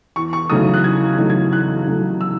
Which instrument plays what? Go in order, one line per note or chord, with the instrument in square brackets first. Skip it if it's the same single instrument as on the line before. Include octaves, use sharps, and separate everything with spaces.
[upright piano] E2 C#6
C#6
C#3 F#3 A3 D#4 D#6
F#6
E2 G#6
C#3 F#3 A3 D#4
G#6
E2 F#6
C#3 F#3 A3 D#4
E6